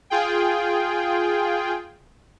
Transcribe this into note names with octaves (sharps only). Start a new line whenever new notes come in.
F4 G#4 G5